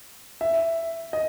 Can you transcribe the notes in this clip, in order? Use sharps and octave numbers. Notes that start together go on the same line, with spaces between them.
E5
D#5